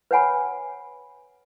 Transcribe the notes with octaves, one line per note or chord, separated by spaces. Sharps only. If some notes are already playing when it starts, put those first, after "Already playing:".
B4 C#5 F#5 G#5 B5